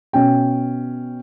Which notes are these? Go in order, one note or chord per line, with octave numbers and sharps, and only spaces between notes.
B2 C#4 G5